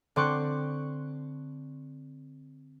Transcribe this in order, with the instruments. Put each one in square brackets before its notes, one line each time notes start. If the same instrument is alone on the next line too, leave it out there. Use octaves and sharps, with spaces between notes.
[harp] D3 C4 D5 C6 C#6 F#6